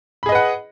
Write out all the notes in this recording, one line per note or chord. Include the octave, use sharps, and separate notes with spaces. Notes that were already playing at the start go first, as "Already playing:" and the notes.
G#4 B4 D#5 F#5 B5